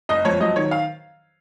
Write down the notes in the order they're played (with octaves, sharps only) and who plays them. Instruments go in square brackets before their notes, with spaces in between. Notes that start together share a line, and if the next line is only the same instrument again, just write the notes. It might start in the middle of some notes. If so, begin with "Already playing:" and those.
[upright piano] F#1 D#5
F2 C#5
F#3 D#5
D#3 C#5
F5